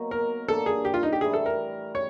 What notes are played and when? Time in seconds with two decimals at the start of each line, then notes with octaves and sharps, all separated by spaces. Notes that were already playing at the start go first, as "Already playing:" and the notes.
Already playing: B2 F#3 A#3 D#4
0.11 A#4
0.48 G2 D3 F3 A#3 A4
0.66 G#4
0.85 G4
0.94 F4
1.03 D#4
1.13 G4
1.21 A2 E3 G3 G#4
1.34 A4
1.46 A#4
1.95 C#3 C#5